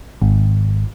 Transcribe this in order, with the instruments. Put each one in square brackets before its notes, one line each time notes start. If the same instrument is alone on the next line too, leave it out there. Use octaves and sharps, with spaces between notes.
[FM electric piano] G#1